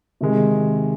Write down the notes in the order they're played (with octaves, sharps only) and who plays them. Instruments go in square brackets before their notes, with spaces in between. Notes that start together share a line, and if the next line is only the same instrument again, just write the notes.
[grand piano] C3 D#3 G#3